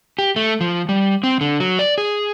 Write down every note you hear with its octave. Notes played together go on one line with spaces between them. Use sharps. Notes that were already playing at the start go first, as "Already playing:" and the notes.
G4
A3
F3
G3
C4
D3
F#3
D5
G#4